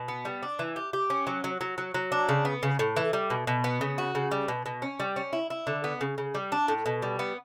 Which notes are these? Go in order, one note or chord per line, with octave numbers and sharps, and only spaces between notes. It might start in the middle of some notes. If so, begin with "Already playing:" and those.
Already playing: B2
B3
G3
D4
E3
G4
G4
C#4
F#3
F#3
F#3
F#3
F#3
D4
C#3
B3
C#3
A2
E3
G3
B2
B2
B3
C#3
F#4
C#3
G3
B2
B2
C#4
G3
C#4
E4
E4
D3
B3
C#3
C#3
G3
D4
A2
B2
G3
B3